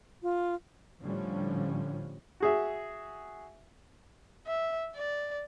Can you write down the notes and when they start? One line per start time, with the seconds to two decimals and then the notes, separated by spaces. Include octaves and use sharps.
0.22 F4
1.01 A2 D3 F3 G3 C#4
2.40 F#4 G#4 E5
4.47 E5
4.95 D5